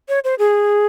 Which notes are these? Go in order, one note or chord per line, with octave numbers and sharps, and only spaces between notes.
C#5
C5
G#4